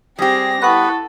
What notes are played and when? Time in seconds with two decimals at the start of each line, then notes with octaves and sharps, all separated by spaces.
0.19 G3 C4 G4 G#4 A#6
0.62 B3 E4 A4 B4 F#5 C#6